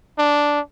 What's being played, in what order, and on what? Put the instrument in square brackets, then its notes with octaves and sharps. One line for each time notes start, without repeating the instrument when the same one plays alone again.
[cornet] D4